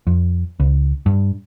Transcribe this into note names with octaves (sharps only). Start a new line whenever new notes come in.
F2
C#2
G2